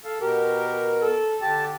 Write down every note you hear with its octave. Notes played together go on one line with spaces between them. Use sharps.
A4 F5
B2 G4 A#4
A4
D3 G4 A5